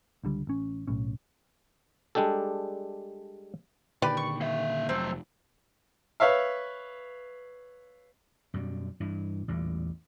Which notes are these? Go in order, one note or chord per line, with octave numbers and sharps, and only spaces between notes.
C#2 D3 G3
A1 C#4
B1 A2 C#4
G3 G#3 D4 G4 A4
A#2 D3 D#3 G4 B4 D5
C#6
A#3 E5
F1 F#3 A3 C4
B4 C#5 E5 F5
F#2 B2 G3
G2 E3
A1 E2 A#2 G3